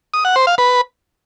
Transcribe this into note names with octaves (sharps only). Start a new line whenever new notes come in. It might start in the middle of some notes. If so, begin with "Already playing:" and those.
D#6
F#5
C5
F5
B4